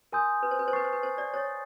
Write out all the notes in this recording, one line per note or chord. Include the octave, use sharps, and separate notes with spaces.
A#4 G#5 C6 D#6 G6
B4
C5
B4
C5
B4 C#6 F#6 A6 C7
C5
B4
C5
D5
C#5 D#6 F#6 A6